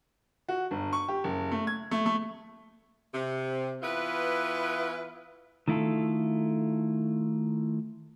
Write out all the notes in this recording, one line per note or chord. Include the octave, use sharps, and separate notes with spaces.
F#4
G1
C#6
G4
F#1
A3
G#6
A3
A3
C3
E3 B3 E4 F4 B4
D#3 A3 E4 F4 A4